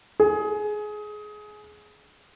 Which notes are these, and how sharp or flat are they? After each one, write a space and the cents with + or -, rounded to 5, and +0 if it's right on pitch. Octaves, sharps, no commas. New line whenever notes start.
G#4 +20